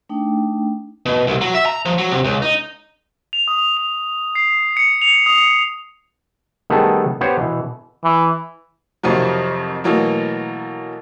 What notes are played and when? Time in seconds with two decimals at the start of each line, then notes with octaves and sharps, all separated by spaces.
0.09 A3 D4 D#4 G5
1.06 B2
1.27 C2
1.41 F#3
1.54 E5
1.66 A#5
1.85 F3
1.98 F#3
2.11 C3
2.25 C#2
2.42 D#4
3.33 F7
3.48 D#6
3.77 F7
4.35 C7
4.77 C#7
5.02 F7
5.26 D#6
6.70 D#3 G3 A3 B3 G#4 A4
7.21 B3 G4 C5 C#5
7.38 B2 E3
8.04 E3
9.03 F2 C3 D#3 F3 F#3
9.84 B2 E3 F#3 A3 A#3